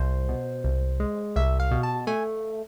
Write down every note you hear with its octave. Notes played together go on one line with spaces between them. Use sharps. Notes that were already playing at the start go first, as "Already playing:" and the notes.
Already playing: C2 C5
B2
C2
G#3
C2 E5
F5
B2
A5
A3 G#5